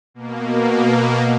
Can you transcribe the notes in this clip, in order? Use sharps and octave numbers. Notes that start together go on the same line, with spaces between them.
B2 A#3